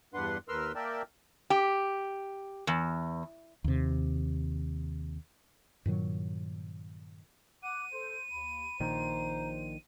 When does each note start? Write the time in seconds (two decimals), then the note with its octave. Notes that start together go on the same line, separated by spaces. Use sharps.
0.14 E2 G2 D4 B4 F#5 C6
0.49 D#2 A#4 B4 C6 E6 F6
0.75 A#3 A#4 D5 E5 G5 A5
1.50 G4
2.67 E2
3.64 D#2 C3
5.86 G2 A#2 D#3 F#3
7.63 F#5 D6 D#7
7.92 A4 C5
8.31 D#2 B5
8.80 A#1 A#2 D#3 C5 A#5